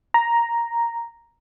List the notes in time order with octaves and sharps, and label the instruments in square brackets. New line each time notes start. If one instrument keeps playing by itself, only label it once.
[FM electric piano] A#5